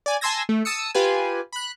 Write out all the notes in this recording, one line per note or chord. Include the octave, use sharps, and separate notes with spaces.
D5 G#5
G#5 A5 C6 E6 G#6 A#6
A3
A5 D#6 E6 C#7
F4 G4 B4 G#5
B5 F#6